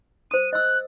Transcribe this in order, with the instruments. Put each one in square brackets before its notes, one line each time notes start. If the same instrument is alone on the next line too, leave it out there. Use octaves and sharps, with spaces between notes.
[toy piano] C5 D#6 [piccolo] D#7
[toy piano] D#5 E6 [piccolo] F#6